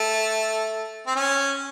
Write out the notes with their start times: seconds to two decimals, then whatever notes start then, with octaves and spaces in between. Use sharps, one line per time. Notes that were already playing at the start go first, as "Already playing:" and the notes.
Already playing: A3
1.07 C4
1.15 C#4